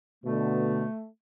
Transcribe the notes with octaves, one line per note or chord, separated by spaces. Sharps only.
B2 D3 A3